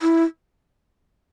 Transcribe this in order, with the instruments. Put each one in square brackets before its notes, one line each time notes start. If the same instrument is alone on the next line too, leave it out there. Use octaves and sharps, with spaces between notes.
[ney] E4